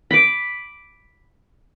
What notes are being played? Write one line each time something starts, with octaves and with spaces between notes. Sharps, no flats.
B5 D6